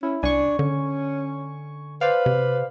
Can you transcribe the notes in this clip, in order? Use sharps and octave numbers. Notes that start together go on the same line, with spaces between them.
C#4 E4
C2 D4 G#5 C#6
D3 C#4
B4 C5 D5 F5
C3